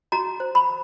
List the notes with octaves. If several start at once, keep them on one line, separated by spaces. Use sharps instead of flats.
F#4 A#5
C5
B5